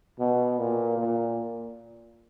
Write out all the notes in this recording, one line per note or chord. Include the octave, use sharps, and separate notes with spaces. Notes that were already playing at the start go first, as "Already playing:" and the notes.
B2
A#2
A#2